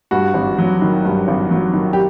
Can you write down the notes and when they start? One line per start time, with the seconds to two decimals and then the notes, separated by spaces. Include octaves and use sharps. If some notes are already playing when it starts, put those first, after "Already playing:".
0.11 G2 F#4
0.34 G#1
0.58 F#3
0.82 D#3
1.05 G2
1.28 G#1
1.51 F#3
1.73 D#3
1.93 G4